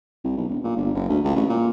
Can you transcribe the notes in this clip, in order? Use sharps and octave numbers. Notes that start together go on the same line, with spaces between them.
C2
B1
E1
A#2
G1
F#1
D2
C#2
A1
A#2